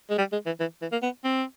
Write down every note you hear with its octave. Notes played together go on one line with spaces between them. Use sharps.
G#3
G3
G#3
E3
E3
E3
A#3
B3
C4